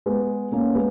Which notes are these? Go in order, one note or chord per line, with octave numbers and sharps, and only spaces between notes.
G#3 B3
A#3 C#4
G#3 B3